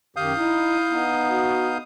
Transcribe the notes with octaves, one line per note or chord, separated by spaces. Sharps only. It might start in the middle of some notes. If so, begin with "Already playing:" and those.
F#2 D#3 G4 F5 D#6 G6
D#4 E4
B3 D#4
F#4